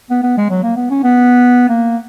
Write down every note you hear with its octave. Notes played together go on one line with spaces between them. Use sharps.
B3
B3
G#3
F#3
A#3
B3
C#4
B3
A#3